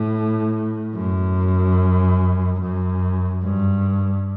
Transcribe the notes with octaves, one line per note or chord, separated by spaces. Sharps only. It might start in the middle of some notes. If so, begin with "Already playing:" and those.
Already playing: A2
F#2
F#2
G2